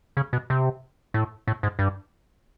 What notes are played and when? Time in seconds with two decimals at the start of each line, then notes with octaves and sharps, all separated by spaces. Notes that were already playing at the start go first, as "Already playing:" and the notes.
0.17 C#3
0.33 B2
0.50 C3
1.14 A2
1.47 A2
1.63 G#2
1.79 G2